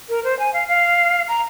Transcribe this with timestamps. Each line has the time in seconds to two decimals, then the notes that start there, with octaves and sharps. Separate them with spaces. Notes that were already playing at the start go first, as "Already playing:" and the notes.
0.09 A#4
0.24 C5
0.39 G#5
0.54 F5
0.68 F5
1.28 A#5